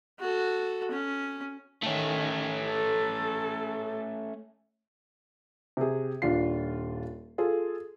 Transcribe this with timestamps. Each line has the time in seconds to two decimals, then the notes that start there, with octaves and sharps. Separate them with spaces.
0.20 F#4 A4
0.91 C#4
1.83 D#3 A3 C#4
2.69 A4
5.77 C3 G#4
6.22 D#1 D4 F4 C7
7.38 F4 G#4 A4